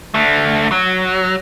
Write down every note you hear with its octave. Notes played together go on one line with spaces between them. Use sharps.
D3 A3
F#3